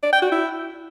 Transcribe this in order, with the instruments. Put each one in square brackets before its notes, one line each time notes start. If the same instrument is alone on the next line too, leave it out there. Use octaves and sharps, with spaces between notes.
[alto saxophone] D5
G5
F#4
E4